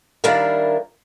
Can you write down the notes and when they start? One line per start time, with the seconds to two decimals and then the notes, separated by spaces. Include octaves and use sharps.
0.24 D#3 G3 D4 E4 A#4 F5